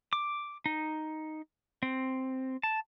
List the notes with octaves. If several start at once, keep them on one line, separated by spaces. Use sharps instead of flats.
D6
D#4
C4
A5